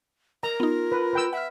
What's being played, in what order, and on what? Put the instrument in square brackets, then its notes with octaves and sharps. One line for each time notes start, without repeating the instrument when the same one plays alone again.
[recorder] A#4 [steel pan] A#5
[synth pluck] B3 D#4 [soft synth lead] F4
[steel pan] B4
B4 G5 E6
[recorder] E5 [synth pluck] F#5 F6